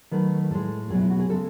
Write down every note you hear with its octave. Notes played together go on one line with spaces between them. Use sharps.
D#3 F#3 A3 B4
A2 G#3 A4
B2 F#3 A3 G#4
E4
F#4
G#4
C#3 G#3 A4